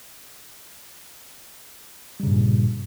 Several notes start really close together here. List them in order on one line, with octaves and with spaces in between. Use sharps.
G3 C#3 G2 A#2